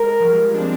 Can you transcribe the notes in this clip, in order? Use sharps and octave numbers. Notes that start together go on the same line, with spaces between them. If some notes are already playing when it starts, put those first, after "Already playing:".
Already playing: G#3 A#4
F3
G3
G#3
D4
C4